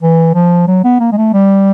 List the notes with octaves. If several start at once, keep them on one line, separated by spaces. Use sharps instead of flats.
E3
F3
F#3
B3
A#3
G#3
A3
G3